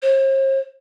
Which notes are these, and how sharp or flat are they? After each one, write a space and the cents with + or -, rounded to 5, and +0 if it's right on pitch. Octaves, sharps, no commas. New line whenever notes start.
C5 +45